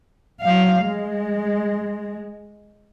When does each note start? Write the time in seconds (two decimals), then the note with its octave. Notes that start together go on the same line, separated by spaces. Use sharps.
0.41 F#3 F5
0.81 G#3